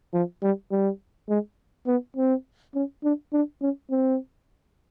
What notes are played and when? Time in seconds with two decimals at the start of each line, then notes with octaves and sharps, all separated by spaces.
0.14 F3
0.43 G3
0.71 G3
1.29 G#3
1.87 B3
2.17 C4
2.75 C#4
3.03 D4
3.33 D4
3.61 C#4
3.91 C4